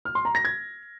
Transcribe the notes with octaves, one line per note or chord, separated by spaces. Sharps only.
F6
C6
A#5
A#6
G#6